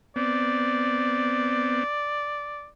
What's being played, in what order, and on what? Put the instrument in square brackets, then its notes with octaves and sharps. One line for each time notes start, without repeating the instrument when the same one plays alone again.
[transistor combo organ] B3 C4 [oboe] D5